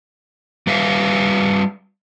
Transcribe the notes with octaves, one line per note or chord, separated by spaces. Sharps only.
G3 B4 E5 F5